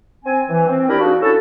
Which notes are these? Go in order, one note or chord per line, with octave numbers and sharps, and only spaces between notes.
C4 G#5
E3
C4
D4 E4 G4 A#4 D5 B5
A#3 D4 D#4 F#4 G#4
C#4 D4 E4 F#4 A4